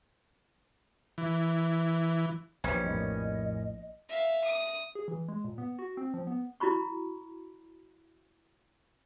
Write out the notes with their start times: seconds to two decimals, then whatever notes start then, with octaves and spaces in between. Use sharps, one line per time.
1.18 E3
2.64 A#1 G3 B3 C#4
2.84 F2 A2 A#3 D#5
4.09 E5 F5
4.44 D#6
4.95 G#4
5.08 E3
5.28 G#3
5.44 A#2
5.58 B3
5.79 F#4
5.97 C4
6.14 F3
6.27 B3
6.60 E4 F#4 A#5 B5 C#6